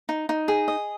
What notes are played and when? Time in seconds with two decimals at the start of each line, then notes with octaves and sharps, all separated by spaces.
0.09 D#4
0.29 D#4
0.48 G#4
0.68 D#5